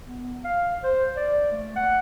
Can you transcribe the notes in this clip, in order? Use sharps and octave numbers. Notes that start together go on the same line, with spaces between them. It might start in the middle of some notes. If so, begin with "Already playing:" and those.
B3
F5
C5
D5
A3
F#5